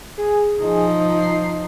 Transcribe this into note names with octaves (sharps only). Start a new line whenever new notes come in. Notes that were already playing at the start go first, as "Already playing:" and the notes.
G#4
F3 D#4
C7